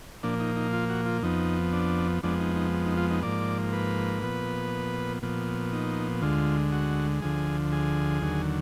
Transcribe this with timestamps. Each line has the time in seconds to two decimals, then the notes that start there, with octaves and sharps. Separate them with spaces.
0.23 A#2 F3 A#3 D4
0.40 D#4
0.56 D#4
0.73 F4
0.90 F#4
1.06 F4
1.22 F2 F3 B3 D#4
1.73 D4
2.23 F2 F3 G#3 B3 D4
2.40 D#4
2.56 D#4
2.86 D#4
2.97 F4
3.10 D#4
3.23 G#2 F3 A#3 D5
3.73 B4
4.22 A#2 F3 B3
5.22 A#2 F3 B3
5.73 D#4
6.22 D2 D3 G#3 F4
6.72 F#4
7.22 D2 D3 F3 G#4
7.72 G#4
8.22 D#2 D3 F#3